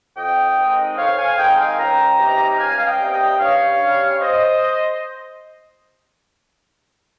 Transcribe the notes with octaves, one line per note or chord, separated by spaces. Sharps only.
F2 D#5 G5
D#3 G#3 C4 D#4
F2 C#5 F5
F5 G#5
D#3 G#3 C4 D#4 D#5 G5
F5 G#5
C#2 G5 A#5
C3 G3 A#3 D#4
C#2 F5 G#5
F5
D#5 G5
C3 G3 A#3 D#4
D#5 G5
G2 C#5 F5
G3 C#4
C5 D#5